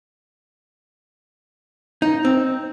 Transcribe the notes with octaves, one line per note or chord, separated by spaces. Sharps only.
D#4
C4